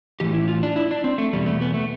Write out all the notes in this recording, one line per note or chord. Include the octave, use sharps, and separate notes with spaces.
A2 E3 G4
E4
F4
D4
E4
D4
C4
A3
E2 B2 G3
A3
B3
A3